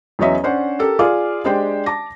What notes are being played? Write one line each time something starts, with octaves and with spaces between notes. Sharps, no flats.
E2 F#3 C#4 C#5 D#5 E5
C#4 D4 C5 F#5
G4 A4 A#4
F4 G#4 D5 F5 D6
G#3 D4 G4 C5 D5 G5
A5 D6 A#6